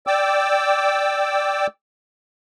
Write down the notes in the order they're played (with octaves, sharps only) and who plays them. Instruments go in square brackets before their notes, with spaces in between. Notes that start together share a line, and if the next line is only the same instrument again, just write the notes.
[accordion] D5 G5 D6 E6